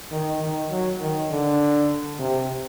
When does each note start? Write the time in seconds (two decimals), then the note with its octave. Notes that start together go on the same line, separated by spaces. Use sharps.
0.11 D#3
0.40 D#3
0.70 F#3
1.00 D#3
1.30 D3
2.19 C3